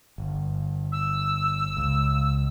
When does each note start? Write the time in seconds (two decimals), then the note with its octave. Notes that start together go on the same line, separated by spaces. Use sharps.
0.18 G1
0.92 E6
1.77 C#2